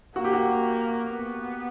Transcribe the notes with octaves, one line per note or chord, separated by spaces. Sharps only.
A#3 F#4
G4
F#4
B3